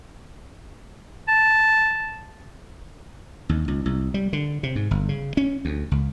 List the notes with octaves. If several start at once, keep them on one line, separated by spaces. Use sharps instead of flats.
A5
D#2
C#2
C2
G3
D3
C3
G#2
G1
C#3
C#4
D2
C#2